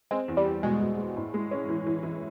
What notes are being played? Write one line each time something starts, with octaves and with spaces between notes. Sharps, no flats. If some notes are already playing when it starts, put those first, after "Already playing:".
G#3 C4
E2
G3
E2
B2 G#3
B2
G#3
A2
G#3
C#4
E3
E3
E3